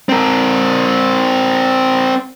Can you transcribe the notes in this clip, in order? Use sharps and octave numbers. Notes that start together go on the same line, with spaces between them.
C4 A#4